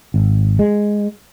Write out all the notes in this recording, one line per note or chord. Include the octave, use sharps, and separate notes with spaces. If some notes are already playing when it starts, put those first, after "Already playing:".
G#1
G#3